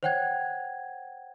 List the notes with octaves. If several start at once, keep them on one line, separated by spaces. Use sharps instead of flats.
C5 C#5 F#5 G5 F#6 G#6